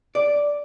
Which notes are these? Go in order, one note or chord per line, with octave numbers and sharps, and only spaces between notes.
D5